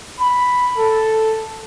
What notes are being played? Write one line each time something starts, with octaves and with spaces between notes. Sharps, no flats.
B5
A4